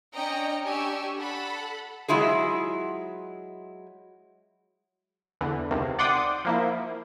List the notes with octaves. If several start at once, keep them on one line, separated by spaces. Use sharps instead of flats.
C#4 D4 D#5 G5 A#5 C#7
D4 G4 G#5 C#6 E6
A4 F#5 B5
F#3 G#3 E4 F4 G#4
E2 D3 E3
C#2 C3 D#3
D5 F#5 G5 C6 D6 D#6
F3 A#3 E4